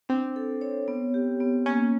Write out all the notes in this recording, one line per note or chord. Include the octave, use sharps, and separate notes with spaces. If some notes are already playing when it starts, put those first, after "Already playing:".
C4 D4
A4
C#5
B3
G4
B3
A#3 C#4